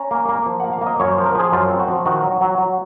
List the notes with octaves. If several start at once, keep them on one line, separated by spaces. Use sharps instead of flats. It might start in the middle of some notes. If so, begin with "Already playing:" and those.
Already playing: C#4 A#5
A#3
A#3
F3
A#3 F#5
F5
A#3
D#5
F#2 C#5
C5
F3
A#4
F3 G#4
F#2 F4
C4
F#4
F3
D#3 F#4
F#3
F#3
F#3